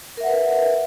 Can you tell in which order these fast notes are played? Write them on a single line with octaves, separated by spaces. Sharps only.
A#4 E5 F#5 B4